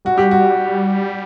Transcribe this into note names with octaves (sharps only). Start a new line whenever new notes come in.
G3 F#4
G4
F#4